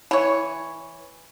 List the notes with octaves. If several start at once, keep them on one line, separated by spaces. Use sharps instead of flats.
E3 C#5